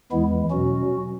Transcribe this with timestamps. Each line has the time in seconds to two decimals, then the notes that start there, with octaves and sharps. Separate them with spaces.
0.12 E2 E3 G#3 B3 E4
0.51 B2 F#3 C#4 F#4